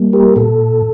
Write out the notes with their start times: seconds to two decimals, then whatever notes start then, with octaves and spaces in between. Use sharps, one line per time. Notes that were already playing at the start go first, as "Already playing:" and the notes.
Already playing: G3 A#3
0.13 G4 A#4
0.36 A#2 A4